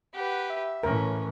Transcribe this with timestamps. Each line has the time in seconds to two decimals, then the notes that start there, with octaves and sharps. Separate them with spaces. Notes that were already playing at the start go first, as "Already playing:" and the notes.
0.14 G4 B4 F#5
0.50 E5
0.83 A2 E3 C#4 A#4